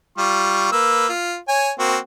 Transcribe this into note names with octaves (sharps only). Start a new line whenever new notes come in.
G3 F4 C#6
A#3 B4 E6
F4
C#5 G#5
A#3 C4 F#4